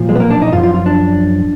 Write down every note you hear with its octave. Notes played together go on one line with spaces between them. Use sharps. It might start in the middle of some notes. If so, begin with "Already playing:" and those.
Already playing: B1 A#2 F3
G#3
B3
A#3
D4
D#4
F#2 F3 F4
F4
F4
D4